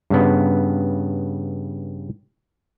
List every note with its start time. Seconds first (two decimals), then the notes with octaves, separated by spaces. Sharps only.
0.10 G2 C#3 B3